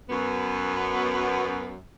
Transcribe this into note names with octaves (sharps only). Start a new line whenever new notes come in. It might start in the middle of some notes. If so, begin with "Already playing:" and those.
F#2 B3